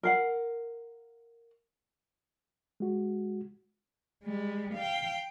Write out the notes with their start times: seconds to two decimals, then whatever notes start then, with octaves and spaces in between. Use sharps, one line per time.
0.03 A#4 F5 F#5
2.80 G#3 F#4
4.24 G3 G#3
4.74 F5 G5